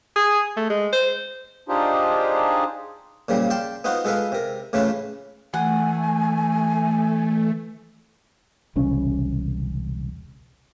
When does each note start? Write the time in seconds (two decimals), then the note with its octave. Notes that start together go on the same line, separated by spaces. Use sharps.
0.16 G#4
0.57 A3
0.70 G#3
0.93 C5
1.69 D4 D#4 F4 G4 G#4 C5
3.28 A#2 C#3 F3 G3
3.50 D5 F5 G5 A5 C6
3.84 B3 D#4 F4 F#4 C5
4.05 G#3 F4 A4 B4 F5
4.32 C3 A#4
4.73 A2 C#3 E3 A3 F4 B4
5.54 E3 A3 F#5 G#5
8.76 E1 C2 C#3 C#4